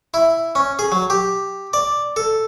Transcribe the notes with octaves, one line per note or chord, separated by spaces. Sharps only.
E4
C#4
G#4
F#3
G4
D5
A4